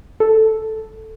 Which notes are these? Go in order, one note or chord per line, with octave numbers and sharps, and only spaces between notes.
A4